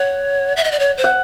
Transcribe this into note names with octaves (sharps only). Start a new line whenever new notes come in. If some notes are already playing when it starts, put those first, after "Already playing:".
Already playing: C#5 F#5
E5
D#5
D5
C#5
C5
F#5